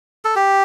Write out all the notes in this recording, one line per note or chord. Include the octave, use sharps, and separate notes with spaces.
A4
G4